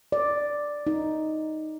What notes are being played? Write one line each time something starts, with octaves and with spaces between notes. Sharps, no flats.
D5
D#4